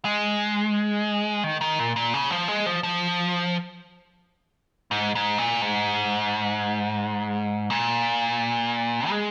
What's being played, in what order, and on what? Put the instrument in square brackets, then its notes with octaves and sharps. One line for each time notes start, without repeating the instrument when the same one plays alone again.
[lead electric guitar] G#3
D#3
D#3
A#2
A#2
C#3
F3
G#3
F3
F3
G#2
G#2
A#2
G#2
A#2
G#3